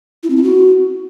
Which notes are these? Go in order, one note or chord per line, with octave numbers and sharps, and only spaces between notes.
E4
C4
E4
F#4